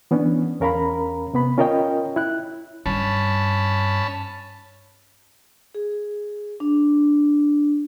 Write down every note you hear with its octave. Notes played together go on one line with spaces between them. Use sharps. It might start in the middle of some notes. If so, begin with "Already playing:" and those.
E3 B3 C#4 D4
E2 C#4 A#4 F5 A#5 B5
C3 B3 B5
C#4 F4 A#4 C#5 D#5 G5
E4 F#6
G2 C#4 A5 B5
G#4
D4